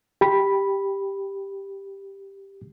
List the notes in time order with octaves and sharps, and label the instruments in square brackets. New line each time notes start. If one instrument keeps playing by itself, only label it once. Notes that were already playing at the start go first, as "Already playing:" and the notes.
[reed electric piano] G4 B5